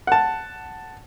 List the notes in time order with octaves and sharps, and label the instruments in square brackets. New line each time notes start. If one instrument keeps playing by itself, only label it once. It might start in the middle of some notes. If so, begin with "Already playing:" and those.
[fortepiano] F#5 A5